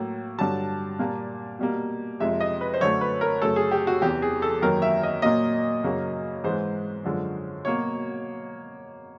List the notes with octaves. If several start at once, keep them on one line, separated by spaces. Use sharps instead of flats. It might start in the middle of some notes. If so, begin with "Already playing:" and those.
Already playing: A2 F#3 A#3
G2 D3 F#3 A5
A#2 G3 A#3
B2 G3 A#3
F2 C3 F3 G#3 E5
D#5
B4
C5
F#2 D3 F#3 A3 C#5
B4
A#4
F#2 C#3 F#3 A3 A4
G#4
G4
F#4
E2 C3 E3 G4
G#4
A4
F#2 D#3 F#3 A#3 A#4
E5
D#5
A#2 F#3 A#3 D#5
F#2 C#3 F#3 A#3
G#2 E3 G#3 C5
F#2 D3 F3 G#3
B2 F#3 A#3 C#5